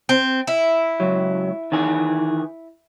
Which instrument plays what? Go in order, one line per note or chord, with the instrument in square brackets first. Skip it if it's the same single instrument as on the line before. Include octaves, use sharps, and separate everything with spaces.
[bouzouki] C4
E4
[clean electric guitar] C#2 F#3
D#3 E3 G#4